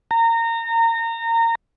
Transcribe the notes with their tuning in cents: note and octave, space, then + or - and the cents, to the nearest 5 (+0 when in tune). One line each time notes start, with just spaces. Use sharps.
A#5 -25